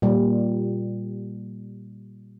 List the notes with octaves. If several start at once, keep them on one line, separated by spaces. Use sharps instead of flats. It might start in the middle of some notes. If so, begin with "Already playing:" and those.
A#2 G3